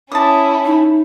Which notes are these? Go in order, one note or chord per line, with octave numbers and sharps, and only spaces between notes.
C#4 E4 A5 D#6
D#4